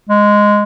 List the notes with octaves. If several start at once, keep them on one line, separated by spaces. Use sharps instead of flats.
G#3